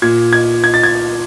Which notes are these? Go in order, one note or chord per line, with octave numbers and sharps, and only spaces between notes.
A#2 G#6
G#6
G#6
A6
G#6